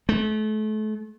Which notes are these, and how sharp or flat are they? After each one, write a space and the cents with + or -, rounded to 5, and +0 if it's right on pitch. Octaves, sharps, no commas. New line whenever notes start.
A3 -35